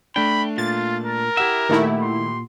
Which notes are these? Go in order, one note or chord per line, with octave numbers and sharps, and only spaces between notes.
A3 D4 G5 B5
A#2 F4 A6
A#4
E4 G4 E5 F#5
A#2 D#3 A3 E4
C6